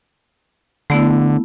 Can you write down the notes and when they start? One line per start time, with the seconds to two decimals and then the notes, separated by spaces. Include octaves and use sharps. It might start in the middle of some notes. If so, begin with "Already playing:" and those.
0.90 D3 A3 B3 E4